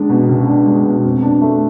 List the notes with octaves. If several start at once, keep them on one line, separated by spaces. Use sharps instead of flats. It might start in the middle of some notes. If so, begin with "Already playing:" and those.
Already playing: C#2 G#3 D4
B2
C#2
D4
G#3
B2
F2
D4
A3